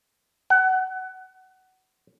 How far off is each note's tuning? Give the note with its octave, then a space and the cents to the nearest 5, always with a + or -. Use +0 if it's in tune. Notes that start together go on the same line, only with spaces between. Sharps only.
F#5 +20